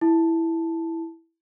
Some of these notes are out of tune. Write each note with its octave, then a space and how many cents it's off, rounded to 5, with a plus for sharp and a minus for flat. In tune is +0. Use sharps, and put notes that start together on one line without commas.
E4 +0 A5 +0